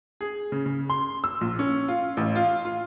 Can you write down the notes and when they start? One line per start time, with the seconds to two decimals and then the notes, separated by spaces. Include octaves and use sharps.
0.21 G#4
0.52 C#3
0.66 C#3
0.90 C6
1.24 E6
1.41 A#1
1.59 C#4
1.88 F4
2.17 A1
2.36 F4
2.65 F4